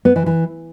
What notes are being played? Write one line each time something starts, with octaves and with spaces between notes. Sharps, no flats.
B3
E3
E3